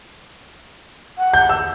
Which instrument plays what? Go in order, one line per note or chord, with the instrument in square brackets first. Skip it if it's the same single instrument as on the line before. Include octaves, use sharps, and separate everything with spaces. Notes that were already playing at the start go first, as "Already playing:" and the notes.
[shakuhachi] F#5
[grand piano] G6
E6